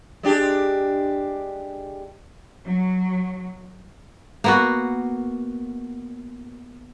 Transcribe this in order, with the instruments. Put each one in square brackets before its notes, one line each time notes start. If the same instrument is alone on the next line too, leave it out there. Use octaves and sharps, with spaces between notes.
[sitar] G#3 D4 G4
[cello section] F#3
[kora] A#3 B3 F#4